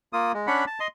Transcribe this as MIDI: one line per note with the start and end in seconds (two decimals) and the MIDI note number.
0.13 0.32 58
0.13 0.32 65
0.13 0.32 87
0.34 0.47 56
0.47 0.65 61
0.47 0.65 62
0.47 0.65 78
0.47 0.65 83
0.67 0.80 81
0.80 0.87 75
0.80 0.87 84